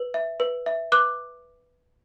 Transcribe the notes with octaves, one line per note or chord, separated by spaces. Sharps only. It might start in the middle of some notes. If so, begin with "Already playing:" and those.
Already playing: B4
E5
B4
E5
B4 D6 F#6